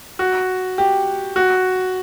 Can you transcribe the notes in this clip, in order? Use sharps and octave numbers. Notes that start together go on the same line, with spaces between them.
F#4
G4
F#4